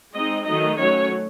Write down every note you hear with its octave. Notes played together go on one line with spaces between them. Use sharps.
G#3 C4 D#4 D#5
D#3 F#3 A3 D#4 D#5
F#3 A3 C#4 C#5